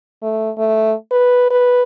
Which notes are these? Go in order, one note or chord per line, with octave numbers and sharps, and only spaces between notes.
A3
A3
B4
B4